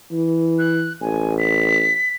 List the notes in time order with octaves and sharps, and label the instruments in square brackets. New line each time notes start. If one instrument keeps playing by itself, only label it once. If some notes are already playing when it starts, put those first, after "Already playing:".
[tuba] E3
[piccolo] F#6
[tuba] A1 [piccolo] G#5
[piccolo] B6